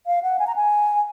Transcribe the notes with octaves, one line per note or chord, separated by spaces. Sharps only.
F5
F#5
G#5
A#5
G#5